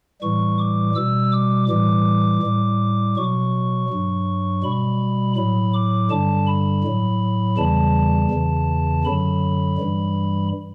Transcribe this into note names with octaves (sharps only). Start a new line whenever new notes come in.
A2 E3 G3 C#6
D6
B2 G3 E6
D6
A2 E3 G3 D6
A2 G3
B2 F#3 C#6
G2 F#3
B2 G3 B5
A2 F#3 B5
D6
G2 D3 G3 A5
B5
A2 F#3
E2 C#3 E3 G3 A5
E2 C#3 E3
F#2 D3 F#3 B5
G2 E3 G3